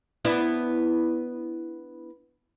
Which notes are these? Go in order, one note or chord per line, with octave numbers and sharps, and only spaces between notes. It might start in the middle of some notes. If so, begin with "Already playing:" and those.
B3 D4 E4